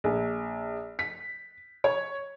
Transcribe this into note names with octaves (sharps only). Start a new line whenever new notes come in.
A#1
B6
C#5